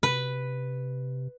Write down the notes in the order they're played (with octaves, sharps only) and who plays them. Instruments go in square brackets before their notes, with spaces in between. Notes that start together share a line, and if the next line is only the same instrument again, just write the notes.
[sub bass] C3 [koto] B4